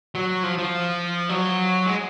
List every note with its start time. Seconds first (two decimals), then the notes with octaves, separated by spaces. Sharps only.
0.15 F#3
0.43 F3
0.58 F3
1.29 F#3
1.86 G#3